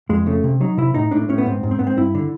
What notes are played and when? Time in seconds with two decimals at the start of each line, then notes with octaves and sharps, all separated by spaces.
0.09 F2 G#3
0.26 C#3 A3
0.44 C3
0.61 F#3 D#4
0.77 C3 E4
0.94 A2 D#4
1.11 A2 D4
1.29 A2 C#4
1.38 B3
1.46 G#2 C4
1.63 G#2
1.71 C4
1.79 G#2 B3
1.87 C4
1.97 G2 E4
2.15 D3